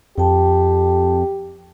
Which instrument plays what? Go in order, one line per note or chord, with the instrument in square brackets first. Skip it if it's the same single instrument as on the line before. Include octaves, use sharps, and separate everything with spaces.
[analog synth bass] F2 [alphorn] G4 [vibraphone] G5 A5